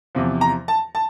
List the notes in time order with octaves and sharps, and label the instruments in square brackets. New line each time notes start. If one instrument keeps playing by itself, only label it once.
[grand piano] E2 C3 F3
A#5
A5
A5